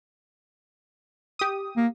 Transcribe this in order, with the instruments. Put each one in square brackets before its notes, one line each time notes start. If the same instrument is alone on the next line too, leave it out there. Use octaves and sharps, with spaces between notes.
[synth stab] G4 D#6
[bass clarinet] A#3